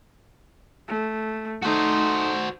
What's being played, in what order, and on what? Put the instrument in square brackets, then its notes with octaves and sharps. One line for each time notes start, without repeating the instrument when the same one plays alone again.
[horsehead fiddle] A3
[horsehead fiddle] A3 D#4 [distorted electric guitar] F#4 C5